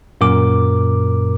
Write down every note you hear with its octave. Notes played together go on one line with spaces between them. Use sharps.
F#2 A#2 A#4 D6